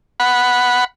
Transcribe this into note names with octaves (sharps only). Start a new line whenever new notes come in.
F#5 B5